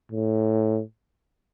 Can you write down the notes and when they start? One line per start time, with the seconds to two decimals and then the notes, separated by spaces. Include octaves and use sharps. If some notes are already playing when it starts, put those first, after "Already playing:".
0.12 A2